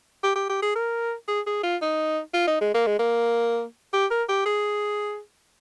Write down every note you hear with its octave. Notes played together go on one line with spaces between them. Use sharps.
G4
G4
G4
G#4
A#4
G#4
G#4
F4
D#4
F4
D#4
G#3
A#3
G#3
A#3
G4
A#4
G4
G#4